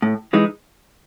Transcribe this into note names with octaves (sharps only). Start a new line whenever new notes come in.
A2
E3 G#3 D#4